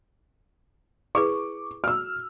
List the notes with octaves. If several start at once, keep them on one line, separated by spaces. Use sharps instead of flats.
E4 G#4 B4 C#6 D6
F#4 E6 F6